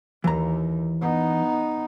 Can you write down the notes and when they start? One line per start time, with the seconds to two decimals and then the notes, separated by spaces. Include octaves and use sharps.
0.24 D#2 E3 A#5
1.01 B3 D#4